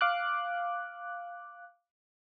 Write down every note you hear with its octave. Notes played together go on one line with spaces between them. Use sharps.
F5 D6 F#6